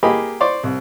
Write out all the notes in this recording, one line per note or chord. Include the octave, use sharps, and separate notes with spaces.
A#3 G4 G#4 D#5 G#5 B5
C5 D5 C6 C#6
C2